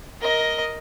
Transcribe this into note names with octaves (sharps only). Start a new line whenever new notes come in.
A#4 D#5